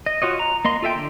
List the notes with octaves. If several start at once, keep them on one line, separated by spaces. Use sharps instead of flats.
D#5
F4 F#4 C#5 D#5
A#5
A#3 D#5 C6
F4 A4 E5 G5
D3